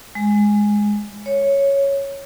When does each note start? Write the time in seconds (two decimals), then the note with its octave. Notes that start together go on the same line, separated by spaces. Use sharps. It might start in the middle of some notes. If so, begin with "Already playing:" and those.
0.15 G#3
1.26 C#5